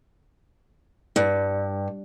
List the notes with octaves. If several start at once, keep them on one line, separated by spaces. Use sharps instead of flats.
G2